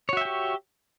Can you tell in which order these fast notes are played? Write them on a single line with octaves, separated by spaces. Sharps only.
C#5 F#4 E5 G5 G4